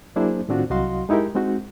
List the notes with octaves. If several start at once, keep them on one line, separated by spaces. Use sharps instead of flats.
F#3 A#3 D4 E4 G#4 C5
A2 D#3 C4 D4 F4 F#4
C2 F#3 F#4 D#5 F5 C6
G#3 D#4 E4 G4 A#4
G#3 C4 D#4 F#4